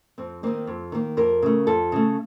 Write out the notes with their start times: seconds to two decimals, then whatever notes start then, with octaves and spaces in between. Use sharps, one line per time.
0.18 F2 C4
0.43 D#3 A#3 C4
0.67 F2
0.92 D#3 A#3
1.17 F2 A#4
1.42 C#3 A3
1.67 F2 A4
1.92 C#3 A3